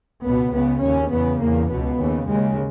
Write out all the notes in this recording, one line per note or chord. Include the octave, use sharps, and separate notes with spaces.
C#2 B2 B3
C#2 C#3 B3
D#2 C#3 C#4
E2 C#3 B3
E2 C#3 A#3
C#2 B2 B3
D#2 C#3
D#2 C#3 G#3